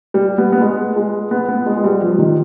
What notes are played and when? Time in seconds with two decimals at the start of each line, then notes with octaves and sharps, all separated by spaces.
0.14 G3
0.38 B3
0.52 B3
0.61 G#3
0.96 G#3
1.31 B3
1.49 B3
1.66 G#3
1.77 G#3
1.84 G3
2.02 F3
2.19 D#3